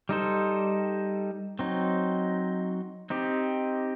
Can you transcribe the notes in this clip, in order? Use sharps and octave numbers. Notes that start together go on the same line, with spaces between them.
G3 D#4 A4 C5
F#3 C4 D#4
C4 D#4 G4